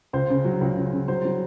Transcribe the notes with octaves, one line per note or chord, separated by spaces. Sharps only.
C#2 C5
C#3
F#3
C#2
C#2
C#3
F#3 C5
F#3